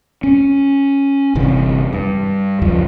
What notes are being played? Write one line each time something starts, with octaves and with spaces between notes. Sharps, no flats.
C#4
G1 C3 E3
G2
C#2 F#2 F3